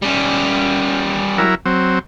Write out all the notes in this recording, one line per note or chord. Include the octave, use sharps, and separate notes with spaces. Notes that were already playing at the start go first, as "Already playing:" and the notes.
G3 C#4
F#3 E4 A#4
F#3 C4